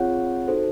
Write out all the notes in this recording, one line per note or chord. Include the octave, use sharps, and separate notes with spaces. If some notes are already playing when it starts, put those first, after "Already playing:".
Already playing: C4 F4 G#4 C#5 F#5
D#4 F#4 A4 C5